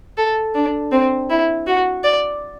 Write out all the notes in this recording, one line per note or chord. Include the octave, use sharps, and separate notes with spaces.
A4
D4
C4
E4
F#4
D5